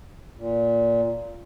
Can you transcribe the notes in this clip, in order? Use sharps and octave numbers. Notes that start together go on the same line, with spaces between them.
A#2